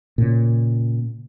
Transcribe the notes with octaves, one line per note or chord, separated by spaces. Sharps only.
A#2 C#3